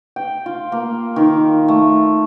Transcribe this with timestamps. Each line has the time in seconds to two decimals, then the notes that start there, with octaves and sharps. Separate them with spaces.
0.16 G5
0.46 F4
0.72 A#3
1.16 D#3
1.68 A3